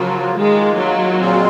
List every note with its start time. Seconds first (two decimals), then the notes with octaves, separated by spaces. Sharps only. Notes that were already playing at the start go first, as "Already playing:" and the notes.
Already playing: C#3 F3 F#3 A#3 F4
0.36 D#3 G#3 A#3 F4
0.77 F#3
1.18 A#2 G#3 C4 F4